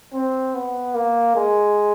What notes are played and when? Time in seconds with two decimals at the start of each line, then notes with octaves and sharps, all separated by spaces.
0.14 C4
0.54 B3
0.95 A#3
1.35 G#3